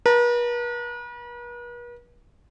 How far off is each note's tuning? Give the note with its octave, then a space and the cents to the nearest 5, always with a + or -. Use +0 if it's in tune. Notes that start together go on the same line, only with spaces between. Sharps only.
B4 -45 A#5 -40